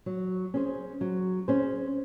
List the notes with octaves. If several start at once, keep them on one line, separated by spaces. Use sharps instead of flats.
F#3
C#4 G#4 C5
F#3
C#4 G#4 C5